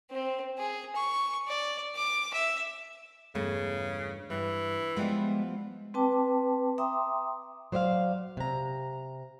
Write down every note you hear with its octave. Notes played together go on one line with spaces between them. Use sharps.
C4
G#4
C#6
D5
D6
E5
E2 G2 C#3 A3
G2 E3
F3 G3 G#3 B3
C4 B4 G5 A5 D6
E5 G5 A#5 C6 D6 D#6
F#3 C5 D5 E5 F5
C3 A#5